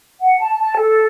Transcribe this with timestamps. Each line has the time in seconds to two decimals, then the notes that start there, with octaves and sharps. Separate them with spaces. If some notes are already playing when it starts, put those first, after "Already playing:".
0.20 F#5
0.40 A5
0.60 A5
0.77 A4